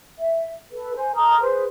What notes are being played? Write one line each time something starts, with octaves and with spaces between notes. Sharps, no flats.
E5
A4 B4
C5 G#5
A4 A#5 D#6 F6
G#4 B4 C5